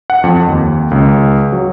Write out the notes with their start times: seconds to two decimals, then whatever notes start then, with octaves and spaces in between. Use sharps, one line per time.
0.10 F#5
0.24 F2
0.49 D#2
0.91 C#2
1.52 F#3